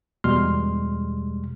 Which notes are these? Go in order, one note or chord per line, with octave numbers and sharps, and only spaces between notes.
E2 B2 G3 G#3 C6 F6